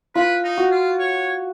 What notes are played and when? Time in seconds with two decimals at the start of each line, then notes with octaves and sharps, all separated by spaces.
0.15 F4 B4
0.44 D#4
0.57 F#4
0.71 F4
0.99 C#5